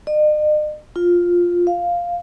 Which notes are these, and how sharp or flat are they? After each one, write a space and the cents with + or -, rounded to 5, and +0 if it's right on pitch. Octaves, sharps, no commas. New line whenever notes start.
D#5 -45
F4 +5
F5 +0